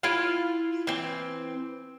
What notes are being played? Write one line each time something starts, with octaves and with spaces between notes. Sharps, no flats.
E4 F4 F5
E3 C4